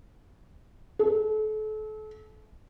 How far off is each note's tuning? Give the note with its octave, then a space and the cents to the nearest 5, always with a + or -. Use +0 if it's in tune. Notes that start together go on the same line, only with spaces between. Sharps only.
A4 -35